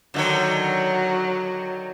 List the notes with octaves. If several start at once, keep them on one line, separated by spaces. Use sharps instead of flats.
D3 D#3 F#3 C#5